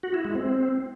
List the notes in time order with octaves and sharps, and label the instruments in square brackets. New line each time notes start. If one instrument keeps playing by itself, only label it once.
[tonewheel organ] F#4
E4
G#3
C4